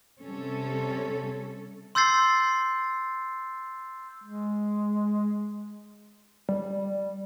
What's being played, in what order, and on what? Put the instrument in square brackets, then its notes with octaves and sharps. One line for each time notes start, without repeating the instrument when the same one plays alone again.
[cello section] C3 G3 C#4 A4
[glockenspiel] C6 E6 G6 A6 C7
[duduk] G#3
[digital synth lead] G3